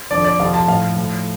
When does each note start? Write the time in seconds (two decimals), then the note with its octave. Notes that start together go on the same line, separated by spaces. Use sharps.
0.11 F2 D3 F3 D5
0.25 D5
0.39 F2 C3 F3 F5
0.54 A5
0.67 A2 F3 F5
0.96 A2 F3